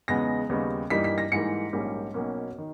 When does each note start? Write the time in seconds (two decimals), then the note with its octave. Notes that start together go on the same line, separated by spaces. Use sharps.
0.08 E2 C#3 G#3 B3 D#4 A#6
0.49 D#2 C#3 G3 B3 D#4
0.90 G2 E3 G3 A#3 D#4 B6
1.04 B6
1.18 A#6
1.32 G#2 E3 G3 A#3 C#7
1.73 A#1 G#2 G3 A#3 C#4
2.14 B1 B2 A#3 C#4
2.58 D#3